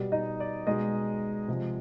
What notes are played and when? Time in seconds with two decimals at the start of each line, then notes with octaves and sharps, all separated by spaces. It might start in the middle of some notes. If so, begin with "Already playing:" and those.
Already playing: B2 G3
0.12 D#4 D#5
0.40 D5
0.67 B2 G#3 D#4 D#5
1.48 C3 F3 G#3